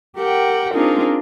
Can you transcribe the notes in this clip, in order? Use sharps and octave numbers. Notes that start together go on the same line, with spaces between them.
G4 A#4 F#5 G5
C4 D4 D#4 F4 G#4 A#4